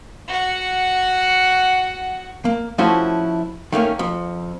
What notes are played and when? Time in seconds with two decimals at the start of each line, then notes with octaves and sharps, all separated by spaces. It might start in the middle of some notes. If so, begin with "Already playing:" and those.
0.28 F#4 F#5
2.45 A#3
2.78 F3 A3 C#4 E4 F#4 C5
3.72 D#3 A3 A#3 C#4
3.99 F2